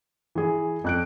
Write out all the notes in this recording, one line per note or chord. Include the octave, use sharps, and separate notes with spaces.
E3 G#4
F2 F#6 D7